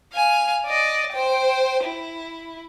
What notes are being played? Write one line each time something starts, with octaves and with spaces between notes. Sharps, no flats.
F5 G#5
D5 D#5
C5 G5
E4